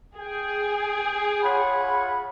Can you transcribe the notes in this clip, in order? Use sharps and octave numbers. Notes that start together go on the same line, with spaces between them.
G#4 G5
F4 C#5 F#5 B5